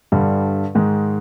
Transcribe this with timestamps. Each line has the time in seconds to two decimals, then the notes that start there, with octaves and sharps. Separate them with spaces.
0.12 G2 D3 G3
0.75 G#2 D#3 G#3